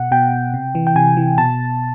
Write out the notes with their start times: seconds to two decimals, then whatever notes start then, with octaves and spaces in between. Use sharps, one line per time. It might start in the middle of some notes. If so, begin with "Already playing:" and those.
Already playing: B2 F#5
0.12 B2 G5
0.54 C3
0.75 E3
0.87 G5
0.95 C3 G#5
1.17 E3
1.38 B2 A5